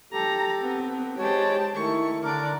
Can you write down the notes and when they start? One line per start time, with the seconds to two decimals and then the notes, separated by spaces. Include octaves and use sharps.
0.13 G4 A4 A#5
0.62 B3 C4
1.18 G#3 G4 C5 C#5 G5 A5
1.75 D#3 A3 E4 C#6
2.23 D3 D4 A#4 D5 D6